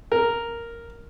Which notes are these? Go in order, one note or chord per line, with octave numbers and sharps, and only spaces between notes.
A#4